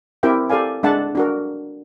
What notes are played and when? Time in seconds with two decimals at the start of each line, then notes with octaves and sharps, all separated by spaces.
0.23 C4 E4 G4 A#4 E5 G5
0.50 G4 A4 D5 F5 G#5
0.83 G#3 D4 E5 F#5 A5
1.15 D4 F#4 A#4